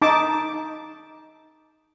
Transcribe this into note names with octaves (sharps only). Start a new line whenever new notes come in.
D#4 A5 D6